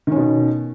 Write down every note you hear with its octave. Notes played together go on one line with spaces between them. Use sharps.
B2 D#3 C#4